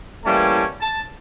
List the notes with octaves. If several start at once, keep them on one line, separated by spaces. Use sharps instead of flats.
A2 E3 G3 A#3 C#4 A5
A5